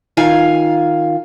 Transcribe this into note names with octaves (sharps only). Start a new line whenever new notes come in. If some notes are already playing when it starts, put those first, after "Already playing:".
D#3 F4 F5 G#5